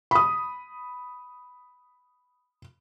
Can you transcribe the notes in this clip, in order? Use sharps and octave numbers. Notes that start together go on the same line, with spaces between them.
B5 D#6